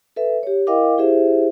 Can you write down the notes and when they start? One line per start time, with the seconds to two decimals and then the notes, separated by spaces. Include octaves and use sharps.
0.16 A4 B4 E5
0.43 G4 C#5
0.67 E4 A#4 D#5 F5 G5 D6
0.98 E4 G4 G#4 C5 E5